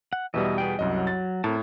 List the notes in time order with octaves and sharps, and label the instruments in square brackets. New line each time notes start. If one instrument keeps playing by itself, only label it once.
[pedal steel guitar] F#5
[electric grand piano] E2 B2 G3 [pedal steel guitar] D#5 E5
[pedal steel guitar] B3 G#4 G5
[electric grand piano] C2 F#2 D#5 [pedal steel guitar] F#3
[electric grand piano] A6
[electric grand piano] A2 [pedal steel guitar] C4 A#4 A5